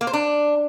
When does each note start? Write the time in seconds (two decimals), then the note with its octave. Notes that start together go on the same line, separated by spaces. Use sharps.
0.01 A#3
0.07 C5
0.13 D4